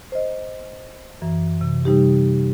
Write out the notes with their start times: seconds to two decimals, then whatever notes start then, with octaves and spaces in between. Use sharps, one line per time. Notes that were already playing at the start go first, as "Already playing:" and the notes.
0.12 C5 D#5
1.22 F#2 E3
1.61 C3
1.85 C3 G3 D#4 G4